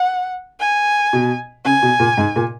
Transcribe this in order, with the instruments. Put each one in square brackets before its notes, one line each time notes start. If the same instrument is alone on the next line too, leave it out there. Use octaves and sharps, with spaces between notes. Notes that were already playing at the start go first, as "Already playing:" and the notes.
Already playing: [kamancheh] F#5
G#5
[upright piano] B2
[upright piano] C#3 [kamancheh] G#5
[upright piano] B2
A#2
G#2
A#2